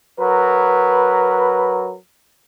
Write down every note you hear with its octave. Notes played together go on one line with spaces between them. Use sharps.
F#3 A#4 B4